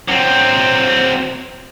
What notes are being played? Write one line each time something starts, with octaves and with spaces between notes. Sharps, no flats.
F#3 C4